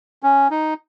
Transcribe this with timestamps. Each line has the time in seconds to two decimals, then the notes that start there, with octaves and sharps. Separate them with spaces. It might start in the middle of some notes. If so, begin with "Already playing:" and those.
0.23 C#4
0.50 D#4